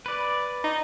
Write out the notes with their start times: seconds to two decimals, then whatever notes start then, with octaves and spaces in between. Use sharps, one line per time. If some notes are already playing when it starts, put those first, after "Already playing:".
0.06 B4 D5
0.64 D#4